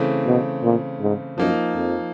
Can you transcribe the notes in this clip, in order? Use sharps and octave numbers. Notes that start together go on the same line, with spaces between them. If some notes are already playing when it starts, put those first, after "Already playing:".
Already playing: C#3 E3 A3 C4
B2
A#2
G#2
F#2 F3 A#3 D#4
F2